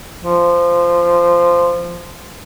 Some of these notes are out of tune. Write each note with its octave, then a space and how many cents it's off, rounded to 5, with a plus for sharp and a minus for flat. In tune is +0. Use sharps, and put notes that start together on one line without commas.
F3 -15